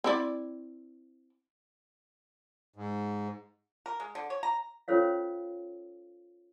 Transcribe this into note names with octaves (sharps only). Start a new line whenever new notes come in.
C4 E4 D5
G#2
A#4
G#3
D3
C#5
A#5
C#4 F4 A4 C5 C#5 F5